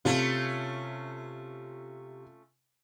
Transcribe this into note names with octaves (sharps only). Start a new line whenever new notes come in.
C3 A3 C#4 F4